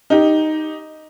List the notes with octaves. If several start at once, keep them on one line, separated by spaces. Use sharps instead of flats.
D#4 G4